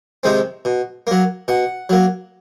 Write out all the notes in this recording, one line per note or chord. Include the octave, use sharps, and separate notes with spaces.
C3 D#3 G#3 C4
B2
F#3 A#3
B2 F#5
F#3 A#3